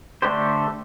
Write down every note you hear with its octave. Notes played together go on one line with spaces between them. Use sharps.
D3 A3 D4 G4 C5